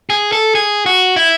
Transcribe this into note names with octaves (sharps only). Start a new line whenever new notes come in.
G#4
A4
G#4
F#4
E4